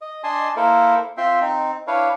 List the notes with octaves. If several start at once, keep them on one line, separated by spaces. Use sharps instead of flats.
D#5
D4 D#5 G#5 A5 C6
A#3 E4 A4 A#4 C5
C4 F4 E5 G5 C6
C4 D#4
D4 E4 B4 C#5 F5